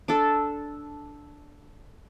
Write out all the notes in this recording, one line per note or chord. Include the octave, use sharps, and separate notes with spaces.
D4 A4